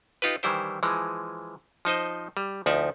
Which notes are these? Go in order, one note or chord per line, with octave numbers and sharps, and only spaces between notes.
D#4 F4 G4 B4
D#3 E3 G3 E4 C5
E3 F3 G#3
F3 D#4 C5 D#5
G3
D2 F3 D#4 D5 E5